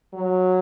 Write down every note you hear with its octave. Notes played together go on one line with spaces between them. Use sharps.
F#3